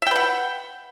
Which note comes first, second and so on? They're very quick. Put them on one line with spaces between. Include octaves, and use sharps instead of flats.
E5 G5 B4 F#5